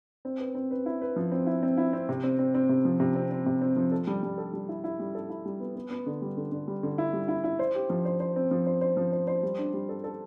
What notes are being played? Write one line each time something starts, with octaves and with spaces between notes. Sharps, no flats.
C4
B4
C4
B4
E4
B4
F3
C4
E4
C4
E4
C4
C3
C4
C4
C4
C3
F3
C3
C4
C4
C3
C4
F3
A4
G3
G3
A4
G3
E4
E4
G3
A4
E4
G3
B3
B3
B3
D3
G3
D3
D3
G3
D3
E4
G3
E4
E4
C5
G4
F3
C5
C5
C4
F3
C5
C5
F3
C5
C5
G3
D4
G3
A4
A4